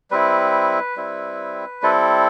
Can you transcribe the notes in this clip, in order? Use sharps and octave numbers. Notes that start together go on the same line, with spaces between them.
G3 C4 E4 B4
G3 C4 E4
G3 C4 E4 A4